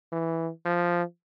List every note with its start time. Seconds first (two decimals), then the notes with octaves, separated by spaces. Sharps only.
0.12 E3
0.66 F3